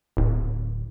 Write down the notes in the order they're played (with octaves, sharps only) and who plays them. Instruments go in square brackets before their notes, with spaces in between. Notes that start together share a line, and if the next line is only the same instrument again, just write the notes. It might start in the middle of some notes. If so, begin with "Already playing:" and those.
[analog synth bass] D1